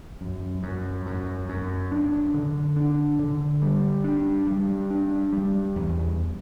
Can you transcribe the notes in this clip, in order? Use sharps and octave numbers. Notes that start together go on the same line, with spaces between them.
F#2
F#2
F#2
F#2
D4
D3
D4
D3
G3
D4
G3
D4
G3
E2